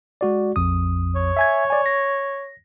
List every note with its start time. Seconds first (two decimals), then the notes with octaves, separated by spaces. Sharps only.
0.21 G#3 F#4 D5
0.56 A#1 F2 D#6
1.16 C#5
1.37 E5 G#5 G#6
1.70 D5 G#5
1.86 A#6